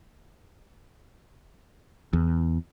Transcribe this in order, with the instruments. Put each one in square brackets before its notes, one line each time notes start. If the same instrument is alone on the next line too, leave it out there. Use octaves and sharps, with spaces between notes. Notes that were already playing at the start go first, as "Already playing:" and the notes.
[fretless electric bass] E2